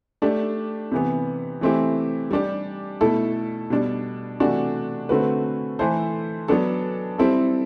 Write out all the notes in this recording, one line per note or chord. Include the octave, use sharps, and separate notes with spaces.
A3 D4 G4
C3 E3 B3
E3 A3 C4 E4 G4
G3 D4 G4
B2 A3 E4 A4
B2 G3 D4
C3 E3 A3 D4 F#4
D3 A3 C4 F#4 B4
E3 A3 E4 A4 C5
F#3 B3 D4 A4
G3 C4 E4 A4